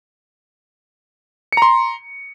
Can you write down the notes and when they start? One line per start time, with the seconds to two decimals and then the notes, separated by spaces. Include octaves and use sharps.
1.53 C#7
1.57 A#5
1.62 C6